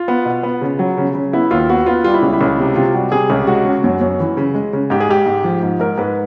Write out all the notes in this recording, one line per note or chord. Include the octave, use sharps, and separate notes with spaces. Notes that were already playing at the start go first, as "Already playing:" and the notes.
Already playing: F4
B3
B2
B3
C#3
F#3
C#3
C#3
B3 E4
D#2 F4
B3 F#4
B3 F4
G3 F4
E4
C#2
E4
C#2
C3
C3 F4
G3 F#4
C3 G#4
C#2 G4
G#3 F#4
C#3
F#2
F#2
E3
C#3
G#3
C#3
G#2 G4
G#4
G#2 G4
G#2
F3
G#2
G#2 A#4
G#2 B4